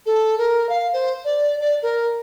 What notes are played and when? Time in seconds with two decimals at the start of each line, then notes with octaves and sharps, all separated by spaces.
0.06 A4
0.38 A#4
0.69 F5
0.93 C5
1.25 D5
1.60 D5
1.82 A#4